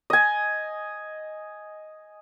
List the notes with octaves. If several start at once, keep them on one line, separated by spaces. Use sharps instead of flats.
D#5 G#5